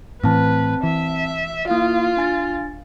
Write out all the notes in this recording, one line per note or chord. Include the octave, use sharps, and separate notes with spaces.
A2 E3 C4 B4 A5
E3 E5
A#3 E4 F4 F5
D4 G#5 A6